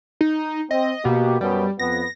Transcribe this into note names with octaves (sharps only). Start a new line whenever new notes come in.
D#4
C4 D#5
B2 A#3 G4
F#2 B2 G3
F2 B3 A#6